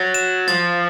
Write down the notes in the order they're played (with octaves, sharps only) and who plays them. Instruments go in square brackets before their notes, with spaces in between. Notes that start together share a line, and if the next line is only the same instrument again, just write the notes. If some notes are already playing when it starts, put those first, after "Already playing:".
Already playing: [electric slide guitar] F#3 [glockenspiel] A6
[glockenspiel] E7
[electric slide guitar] F3 [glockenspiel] A6